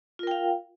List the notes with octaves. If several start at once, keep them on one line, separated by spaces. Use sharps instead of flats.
F4 A#4 F5 G5